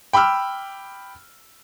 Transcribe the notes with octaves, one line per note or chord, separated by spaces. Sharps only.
G5 B5 D6 E6 F6